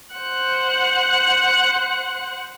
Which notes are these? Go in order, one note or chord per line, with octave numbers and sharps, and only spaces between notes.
C5 F#5 F#6